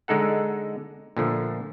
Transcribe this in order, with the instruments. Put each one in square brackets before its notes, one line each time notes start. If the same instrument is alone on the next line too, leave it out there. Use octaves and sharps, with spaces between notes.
[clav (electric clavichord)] D3 G#3 D#4 A4 F#5
A#2 D3 F3 A3